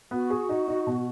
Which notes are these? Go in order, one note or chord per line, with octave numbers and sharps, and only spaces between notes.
B3 F#4
G#4
D#4
D#4
B2